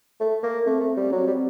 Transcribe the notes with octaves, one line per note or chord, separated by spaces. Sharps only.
A3
A#3
A3 C4
A3
G3
F#3 C4
G3